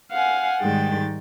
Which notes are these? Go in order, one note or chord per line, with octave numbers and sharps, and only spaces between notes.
F5 F#5 G#5
G#2 D#3 G3 G#3 G5 A6